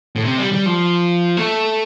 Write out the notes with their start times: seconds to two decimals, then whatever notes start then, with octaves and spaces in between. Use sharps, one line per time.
0.16 A2
0.24 C3
0.38 G3
0.53 G3
0.66 F3
1.37 A3